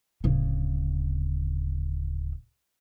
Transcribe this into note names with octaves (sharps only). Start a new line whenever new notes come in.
D1 C#3